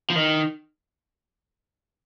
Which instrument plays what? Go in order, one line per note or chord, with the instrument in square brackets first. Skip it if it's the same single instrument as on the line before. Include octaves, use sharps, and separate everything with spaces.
[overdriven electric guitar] F3
D#3